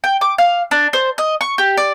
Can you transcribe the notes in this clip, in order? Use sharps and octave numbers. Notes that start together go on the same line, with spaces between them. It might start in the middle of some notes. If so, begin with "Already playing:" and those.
G5
D6
F5
D4
C5
D#5
C#6
G4
D5